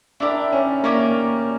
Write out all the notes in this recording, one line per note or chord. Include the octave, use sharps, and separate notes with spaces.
D4 E4 G4 A#4 D5
C#4
A#3 C#4 G4 A#4 D5